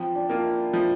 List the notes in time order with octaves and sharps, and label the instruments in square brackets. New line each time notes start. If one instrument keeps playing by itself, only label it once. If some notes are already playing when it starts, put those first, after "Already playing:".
Already playing: [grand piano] F3 [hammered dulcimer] C4
[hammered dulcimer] D4
[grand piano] A#3 F4
[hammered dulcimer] E4
[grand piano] F3 [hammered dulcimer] E4